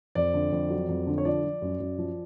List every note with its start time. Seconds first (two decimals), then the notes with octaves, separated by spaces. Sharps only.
0.15 F2 D5
0.34 D3
0.52 F2
0.70 F#3
0.89 F2
1.07 D3
1.18 C#5
1.25 F3 D5
1.44 F3
1.62 F#2
1.80 F#2
1.98 F3